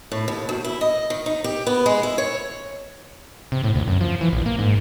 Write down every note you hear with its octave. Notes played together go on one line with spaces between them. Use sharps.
A2
D#2
D2
E4
D#5
D#3
D#4
G4
B3
G#3
E4
C#5
C3
A2
D2
F#2
F3
E3
A#1
A#3
G#2